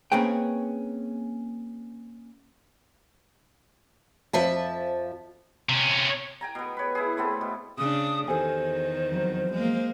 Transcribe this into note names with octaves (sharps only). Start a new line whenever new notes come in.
A#3 C4 C#4 G#4 B4 G5
F2 F3 E5 A5
C3 C#4
G5 G#5 A#5
B2 B3
B4 C#5
E4 G#4
A3 B3 C4 A4
B2
C#3 D4 D#6
E2 D#3 G4 A4 C5 G#5
F2 F#3
G#3 A#3